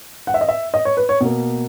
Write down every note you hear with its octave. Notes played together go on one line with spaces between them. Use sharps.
F#5
E5
D#5
E5
D#5
C#5
B4
C#5
B2 A#3